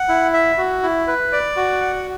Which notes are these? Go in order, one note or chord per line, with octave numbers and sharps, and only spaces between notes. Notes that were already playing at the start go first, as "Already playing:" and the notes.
Already playing: F#5
E4
E5
F#4
E4
B4
D5
F#4
F#5